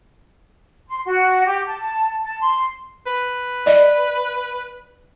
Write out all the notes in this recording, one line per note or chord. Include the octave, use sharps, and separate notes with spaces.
C6
F#4
G4
A5
A5
C6
B4
D5 D#5